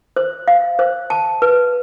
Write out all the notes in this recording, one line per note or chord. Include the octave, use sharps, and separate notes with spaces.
C5
F5
C5
A5
B4